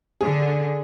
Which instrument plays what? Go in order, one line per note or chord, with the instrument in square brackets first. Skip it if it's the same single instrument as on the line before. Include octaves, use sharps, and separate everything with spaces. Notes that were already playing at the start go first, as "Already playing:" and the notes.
[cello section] D3 [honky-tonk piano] G#4